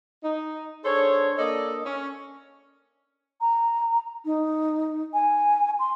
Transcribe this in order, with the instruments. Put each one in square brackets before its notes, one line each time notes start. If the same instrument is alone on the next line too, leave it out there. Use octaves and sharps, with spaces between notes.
[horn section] D#4
D4 G#4 A4 C5 C#5
A#3 D4 A4 D5 D#5
C#4
[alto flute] A#5
D#4
G#5
C6